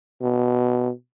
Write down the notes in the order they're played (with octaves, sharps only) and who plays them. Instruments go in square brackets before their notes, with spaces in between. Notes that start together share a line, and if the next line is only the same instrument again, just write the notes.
[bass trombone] B2